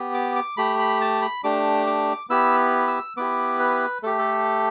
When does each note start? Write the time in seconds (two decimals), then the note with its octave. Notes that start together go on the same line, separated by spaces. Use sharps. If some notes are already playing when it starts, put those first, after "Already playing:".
Already playing: B3 G4
0.14 D6
0.36 D6
0.57 A3 G4 B5
0.79 B5
1.01 A5
1.22 B5
1.44 A3 D4 G4 D6
1.87 D6
2.30 B3 E4 G4 E6
2.88 E6
3.17 B3 E4 G4 D6
3.59 B4
4.03 A3 A4
4.06 G4
4.19 A4